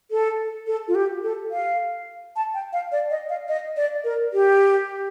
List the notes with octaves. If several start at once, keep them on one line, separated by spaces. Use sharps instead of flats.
A4
A4
F4
G4
A4
F5
A5
G5
F5
D5
D#5
F5
D#5
D5
A#4
G4